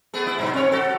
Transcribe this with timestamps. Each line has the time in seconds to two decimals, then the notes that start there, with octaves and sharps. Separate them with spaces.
0.14 A3 B3 G#4
0.27 E4
0.39 G2 B2 F#3
0.53 C4 C#5
0.72 F#4 A4